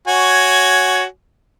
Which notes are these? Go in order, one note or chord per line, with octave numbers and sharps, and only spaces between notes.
F#4 C#5 G#5